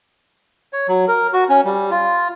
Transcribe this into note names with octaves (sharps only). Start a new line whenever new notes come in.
C#5
F#3
A#4
F#4
C#4
G3
F4